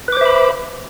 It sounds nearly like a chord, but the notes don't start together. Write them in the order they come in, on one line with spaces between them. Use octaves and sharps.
B4 D6 C5 E5 B5